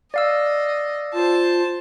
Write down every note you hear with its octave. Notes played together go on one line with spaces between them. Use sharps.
D5 D#5 F5 E6
F4 C5 A5